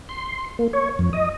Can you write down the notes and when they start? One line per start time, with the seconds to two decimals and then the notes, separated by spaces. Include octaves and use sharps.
0.09 C6
0.59 A#3
0.73 C#5
0.99 F2
1.13 D#5